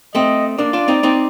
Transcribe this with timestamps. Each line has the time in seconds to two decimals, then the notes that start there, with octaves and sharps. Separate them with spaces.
0.15 A3 C4 D#5
0.58 A#3 D4 D5
0.73 D4 F4
0.88 C4 D#4
1.03 C4 D#4